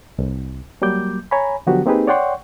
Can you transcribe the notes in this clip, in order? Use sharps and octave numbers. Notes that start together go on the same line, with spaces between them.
C2
F#3 G3 A#3 D6 G6
C#5 G#5 A#5 B5
D3 F3 F#3 B3 F#4 G4
A#3 C4 D#4 G4 G#4 B4
C#5 D5 F#5 G5 C6 C#6